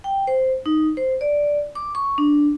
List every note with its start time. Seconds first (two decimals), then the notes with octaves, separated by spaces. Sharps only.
0.04 G5
0.27 C5
0.66 D#4
0.97 C5
1.21 D5
1.75 D6
1.95 C#6
2.18 D4